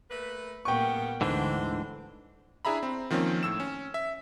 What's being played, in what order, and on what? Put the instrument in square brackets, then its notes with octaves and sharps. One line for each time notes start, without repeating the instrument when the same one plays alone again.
[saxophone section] A3 A#3 B4
[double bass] A#2 A#3 [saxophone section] C#3 G3 B3 [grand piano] G5 C#6
[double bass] D2 [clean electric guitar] G#2 D3 E3 [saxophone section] D4 C5
[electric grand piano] D4 E4 G#4 E5 A#5 B5
C4
D#3 F3 A#3 C4 C#4
A2 E6 E7
C#4
E5